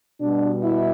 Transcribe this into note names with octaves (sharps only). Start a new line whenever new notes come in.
B2 G3 D4
E4